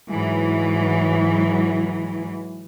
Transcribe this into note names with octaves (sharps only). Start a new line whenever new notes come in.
G#2 E3 F#3